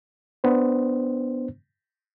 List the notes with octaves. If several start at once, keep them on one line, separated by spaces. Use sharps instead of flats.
B3 D4 C5